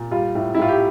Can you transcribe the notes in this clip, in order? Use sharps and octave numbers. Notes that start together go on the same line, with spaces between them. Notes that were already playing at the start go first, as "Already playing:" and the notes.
Already playing: A#2
G3 F4
A2
E4
A2 F4
G4